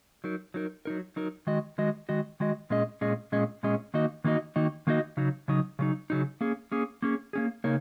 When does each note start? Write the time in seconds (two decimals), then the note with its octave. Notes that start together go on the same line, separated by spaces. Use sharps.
0.24 F#3 D#4 A#4
0.54 F#3 D#4 A#4
0.85 F#3 D#4 A#4
1.16 F#3 D#4 A#4
1.47 D#3 G#3 F#4 D#5
1.78 D#3 G#3 F#4 D#5
2.09 D#3 G#3 F#4 D#5
2.40 D#3 G#3 F#4 D#5
2.70 A#2 G#3 C#4 G#4 D#5
3.01 A#2 G#3 C#4 G#4 D#5
3.32 A#2 G#3 C#4 G#4 D#5
3.63 A#2 G#3 C#4 G#4 D#5
3.94 D#3 A#3 D#4 F#4 D#5
4.24 D#3 A#3 D#4 F#4 D#5
4.56 D#3 A#3 D#4 F#4 D#5
4.87 D#3 A#3 D#4 F#4 D#5
5.17 C#3 F#3 D#4
5.48 C#3 F#3 D#4
5.79 C#3 F#3 D#4
6.10 C#3 F#3 D#4
6.41 A#3 C#4 G#4
6.72 A#3 C#4 G#4
7.02 A#3 C#4 G#4
7.33 A#3 C#4 G#4
7.64 C#3 A#3 D#4 A#4 C#5